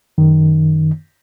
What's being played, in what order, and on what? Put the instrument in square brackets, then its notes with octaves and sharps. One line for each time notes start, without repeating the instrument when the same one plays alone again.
[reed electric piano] F#2 D#3